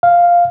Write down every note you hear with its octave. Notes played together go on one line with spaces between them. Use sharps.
F5